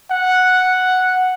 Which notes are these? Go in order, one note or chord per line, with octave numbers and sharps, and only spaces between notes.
F#5